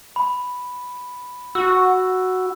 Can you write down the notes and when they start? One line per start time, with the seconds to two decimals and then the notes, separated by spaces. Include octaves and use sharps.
0.16 B5
1.55 F#4 E6